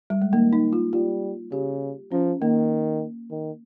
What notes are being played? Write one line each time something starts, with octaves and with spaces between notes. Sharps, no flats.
G3
G#3
D#3 A#3
D#4
F4
G3 F4
C#3 G4
F3 C#4
D#3 A#3
D#3